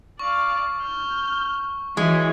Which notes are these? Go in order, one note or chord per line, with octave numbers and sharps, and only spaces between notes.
D5 F5 C#6
F6 G6
E3 G#3 F#4 C#5